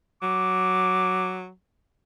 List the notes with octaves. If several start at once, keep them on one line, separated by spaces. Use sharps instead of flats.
F#3 D6